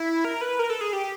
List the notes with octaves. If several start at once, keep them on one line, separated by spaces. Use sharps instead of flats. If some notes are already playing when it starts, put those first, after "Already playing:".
Already playing: E4
A#4
B4
A#4
A4
G#4
G4